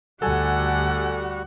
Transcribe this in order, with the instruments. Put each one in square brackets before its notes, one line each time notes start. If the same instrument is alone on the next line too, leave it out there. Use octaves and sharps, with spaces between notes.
[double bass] D2 [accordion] G3 F#4 [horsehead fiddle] G4 F#5 [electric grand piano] A4 G#5